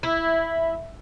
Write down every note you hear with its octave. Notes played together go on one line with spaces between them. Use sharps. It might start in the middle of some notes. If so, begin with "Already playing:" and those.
E4